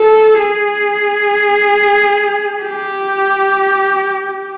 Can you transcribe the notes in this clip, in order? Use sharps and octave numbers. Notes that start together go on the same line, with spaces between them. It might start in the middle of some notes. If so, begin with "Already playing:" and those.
Already playing: A4
G#4
G4